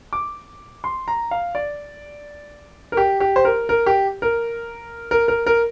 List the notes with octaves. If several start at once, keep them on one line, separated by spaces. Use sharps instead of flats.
D6
C6
A#5
F5
D5
A#4
G4
G4
C5
A#4
A#4
G4
A#4
A#4
A#4
A#4